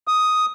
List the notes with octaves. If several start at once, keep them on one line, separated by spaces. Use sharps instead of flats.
D#6